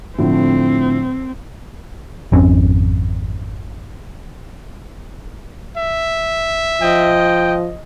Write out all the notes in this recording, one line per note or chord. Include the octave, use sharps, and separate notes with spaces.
A2 D3 F3 C4
G#1 F2 C4 C#4
E5
F3 D#5 G5